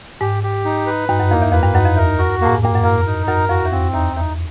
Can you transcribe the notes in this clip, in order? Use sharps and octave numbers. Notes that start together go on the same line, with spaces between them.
G#2 G4
G4
D#4
B4
G2 D#4
F#2
F2 A#3
E2
F2 B4
G2
F#2 D#4
F2
E2 A#4
F#4
A2 A#3
G#2
G2 A#3
F#2
F2 A#4
D#4
F#2 A#4
F2 F#4
E2
F2 C4
E2 D#4
E2 D#4